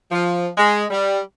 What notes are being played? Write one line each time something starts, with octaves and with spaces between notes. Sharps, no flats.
F3
G#3
G3